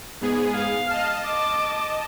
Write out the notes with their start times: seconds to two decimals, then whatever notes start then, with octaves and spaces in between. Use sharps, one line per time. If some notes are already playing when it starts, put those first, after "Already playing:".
0.21 G#2 B3 G#4
0.56 F5
0.90 D#5 A5
1.26 D6